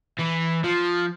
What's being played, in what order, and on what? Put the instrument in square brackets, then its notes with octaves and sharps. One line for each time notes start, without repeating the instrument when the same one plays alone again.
[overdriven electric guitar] E3
F3